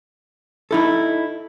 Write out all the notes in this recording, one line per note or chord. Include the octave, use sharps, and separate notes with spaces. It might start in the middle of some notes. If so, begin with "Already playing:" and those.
D#4 E4 A4